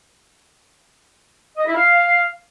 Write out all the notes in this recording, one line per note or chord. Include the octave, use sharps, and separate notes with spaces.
D#5
E4
F5